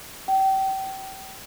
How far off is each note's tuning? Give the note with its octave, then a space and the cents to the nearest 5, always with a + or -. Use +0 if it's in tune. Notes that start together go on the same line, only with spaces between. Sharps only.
G5 -30